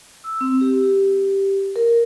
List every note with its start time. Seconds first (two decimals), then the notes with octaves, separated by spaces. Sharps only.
0.24 E6
0.41 C4
0.61 G4
1.76 A#4